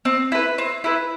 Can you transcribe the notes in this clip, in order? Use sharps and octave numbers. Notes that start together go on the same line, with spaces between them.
C4
E4 B4
C4
E4 B4